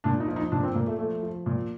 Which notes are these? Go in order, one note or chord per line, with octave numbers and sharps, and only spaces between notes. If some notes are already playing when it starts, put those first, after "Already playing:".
A#2 D4
D#4
F3
D#4
A#2 D4
C4
A#2 A#3
A3
F3 A3
F3
A#2